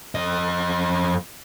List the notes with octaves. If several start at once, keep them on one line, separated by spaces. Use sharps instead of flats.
F2 D#5